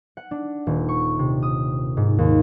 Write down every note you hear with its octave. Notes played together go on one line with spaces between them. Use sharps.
F#5
D4
D#1
C#6
C3
D#6
G#2
D#2